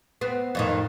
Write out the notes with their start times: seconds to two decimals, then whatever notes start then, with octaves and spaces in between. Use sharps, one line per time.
0.21 B3 C4
0.55 F2 A2 D#3